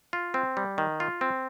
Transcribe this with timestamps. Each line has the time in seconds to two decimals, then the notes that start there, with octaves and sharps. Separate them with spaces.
0.13 F4
0.34 C4
0.57 G3
0.78 D#3
1.00 F4
1.21 C4